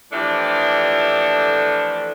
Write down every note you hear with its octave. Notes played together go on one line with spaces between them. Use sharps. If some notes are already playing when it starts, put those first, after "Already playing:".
E3 F3 A3 D4 G4 A4